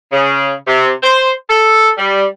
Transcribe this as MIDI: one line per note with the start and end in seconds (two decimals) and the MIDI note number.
0.12 0.52 49
0.67 0.91 48
1.03 1.31 72
1.49 1.90 69
1.98 2.25 55